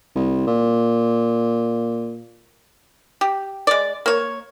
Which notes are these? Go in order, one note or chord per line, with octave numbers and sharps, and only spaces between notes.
C2
A#2
G4
G#3 D5
A#3 C#5